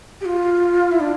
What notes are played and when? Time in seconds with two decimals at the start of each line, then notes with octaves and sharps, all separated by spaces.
0.21 G4
0.25 F4
0.91 E4
1.00 D4